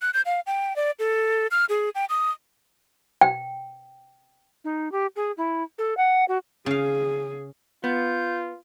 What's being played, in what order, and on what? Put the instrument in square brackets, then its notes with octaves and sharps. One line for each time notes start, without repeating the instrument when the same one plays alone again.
[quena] F#6
G6
F5
G5
D5
A4
F6
G#4
G5
D#6
[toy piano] G5
[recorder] D#4
G4
G#4
E4
A4
F#5
F#4
[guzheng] C#3 F5 [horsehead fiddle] G#4
[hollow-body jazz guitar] B3 [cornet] F4 [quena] G6